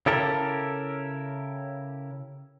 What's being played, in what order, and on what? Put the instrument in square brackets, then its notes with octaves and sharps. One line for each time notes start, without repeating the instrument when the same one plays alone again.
[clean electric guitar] C#3 E4 G4 A4 A#4